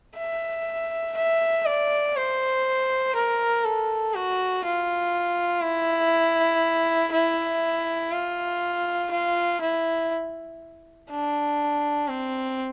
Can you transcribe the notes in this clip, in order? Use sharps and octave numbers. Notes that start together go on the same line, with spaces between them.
E5
E5
D5
C5
A#4
A4
F#4
F4
E4
E4
F4
F4
E4
D4
C4